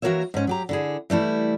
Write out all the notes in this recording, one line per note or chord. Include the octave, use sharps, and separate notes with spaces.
E3 A#3 F#4 A#4 C#5 E5
G#2 C#4
F#3 G4 A#5
D3 E4 G#4
E3 G3 A3 E4